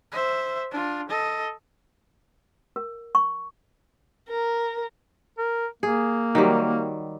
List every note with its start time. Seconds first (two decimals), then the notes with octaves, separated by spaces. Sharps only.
0.12 C5 E5
0.71 D4 F4
1.09 A4 D#5
2.76 A#4
3.15 C#6
4.29 A#4
5.38 A#4
5.83 A#3 G#4
6.35 D#3 F#3 G3